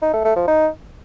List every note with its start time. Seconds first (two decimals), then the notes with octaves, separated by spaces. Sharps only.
0.02 D#4
0.13 A3
0.25 A3
0.36 F3
0.47 D#4